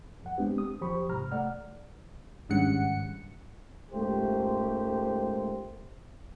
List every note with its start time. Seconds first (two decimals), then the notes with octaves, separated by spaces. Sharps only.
0.23 F2 F#5
0.38 G#3 B3 C4 D4 G4
0.58 D#6
0.81 E2 F3 G4 C5 B5 C#6
1.09 C2 G#2 C3 A#5 F6
1.31 A3 D5 F#5 F6
2.49 G#1 G2 C#3 F#5 C#7
3.91 C#2 G#2 A3 A#3 G4 C5